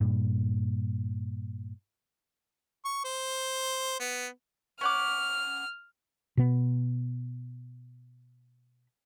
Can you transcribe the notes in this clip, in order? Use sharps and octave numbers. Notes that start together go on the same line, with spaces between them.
G2 A#2
C#6
C5
B3
C#4 F#5 D6 F6
B2 B3